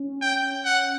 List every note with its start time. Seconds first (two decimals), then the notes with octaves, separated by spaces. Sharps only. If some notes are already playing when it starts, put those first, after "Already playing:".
Already playing: C#4
0.22 G5
0.65 F#5